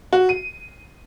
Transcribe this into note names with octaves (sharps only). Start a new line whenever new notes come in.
F#4
D#7